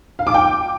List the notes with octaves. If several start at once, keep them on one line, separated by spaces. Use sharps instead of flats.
F5
D6
G5